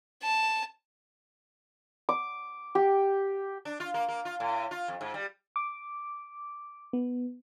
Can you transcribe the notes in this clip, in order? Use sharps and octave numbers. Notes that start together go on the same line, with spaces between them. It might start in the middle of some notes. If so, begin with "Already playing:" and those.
A5
D6
G4
D4
F4
A#3
A#3
F4
A2
F4
F2
G#2
G3
D6
B3